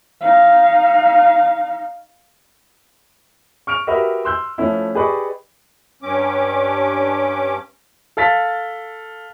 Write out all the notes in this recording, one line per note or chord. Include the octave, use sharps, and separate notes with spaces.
D#4 F5
C#6 F6 D7 F7
F#4 G4 A#4 B4 D#5 E5
C6 E6 F#6 G6
F3 A3 C#4 E4
G4 G#4 B4 D5 D#5 C#6
G2 C#4 D6
A4 F5 A6 B6